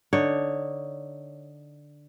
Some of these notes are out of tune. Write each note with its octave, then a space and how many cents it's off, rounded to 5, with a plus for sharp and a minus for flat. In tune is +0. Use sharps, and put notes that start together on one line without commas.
D3 +0 D#4 +0 C#5 +0